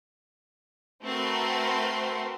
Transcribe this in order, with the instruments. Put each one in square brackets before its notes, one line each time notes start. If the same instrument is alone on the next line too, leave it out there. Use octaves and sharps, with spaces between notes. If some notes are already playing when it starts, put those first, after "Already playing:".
[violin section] A3 C4 F#4 A#4 B4 C6